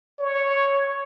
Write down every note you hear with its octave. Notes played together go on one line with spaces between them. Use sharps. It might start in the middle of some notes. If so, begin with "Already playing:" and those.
C#5